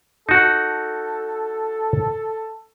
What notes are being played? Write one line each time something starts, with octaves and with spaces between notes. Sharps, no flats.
D#4 F#4 A4